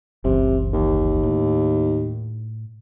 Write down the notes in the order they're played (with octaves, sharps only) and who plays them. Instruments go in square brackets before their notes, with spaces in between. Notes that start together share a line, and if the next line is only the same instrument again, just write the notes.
[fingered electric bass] F#1 C#2 E3 [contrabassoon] C3
[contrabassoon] D#2
[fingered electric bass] A2